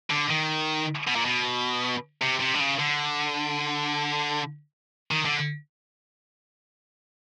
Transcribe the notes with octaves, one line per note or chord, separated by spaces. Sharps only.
D3
D#3
B2
A#2
B2
C3
C3
D3
C#3
D3
D#3
D3